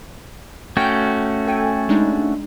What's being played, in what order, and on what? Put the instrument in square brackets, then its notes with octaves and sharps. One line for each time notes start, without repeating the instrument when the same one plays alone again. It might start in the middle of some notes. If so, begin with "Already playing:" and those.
[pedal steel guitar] A3 C#4 F#4 [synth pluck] G5 F6 G6
[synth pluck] A4 G5 G#5
G#3 D4 D#4